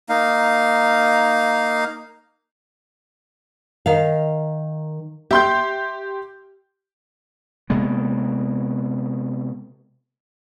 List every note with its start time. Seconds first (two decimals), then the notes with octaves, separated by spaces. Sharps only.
0.09 A#3 D#4 F5
3.86 D#3 F5
5.31 G4 E5 G5 C6 G6
7.70 C3 G#3 A#3 B3